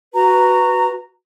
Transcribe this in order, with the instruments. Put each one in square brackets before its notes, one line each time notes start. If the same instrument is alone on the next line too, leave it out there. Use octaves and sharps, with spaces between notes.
[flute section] F#4 B4 A#5